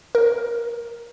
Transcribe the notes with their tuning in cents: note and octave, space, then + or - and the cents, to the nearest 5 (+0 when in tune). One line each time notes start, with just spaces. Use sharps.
A#4 +15